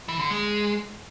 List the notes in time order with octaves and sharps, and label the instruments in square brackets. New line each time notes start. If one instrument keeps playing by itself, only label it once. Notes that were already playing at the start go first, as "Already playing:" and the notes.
[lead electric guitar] E3
D3
G#3